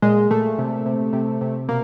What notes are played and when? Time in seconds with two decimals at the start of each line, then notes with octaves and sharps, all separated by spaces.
0.02 A#2 G#3
0.31 A#2 A3
0.58 C3
0.86 C3
1.13 C3
1.41 C3
1.69 B2 A#3